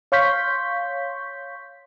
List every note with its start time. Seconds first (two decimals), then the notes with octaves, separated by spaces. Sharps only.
0.12 C#5 F5 C6 C#6 G6 B6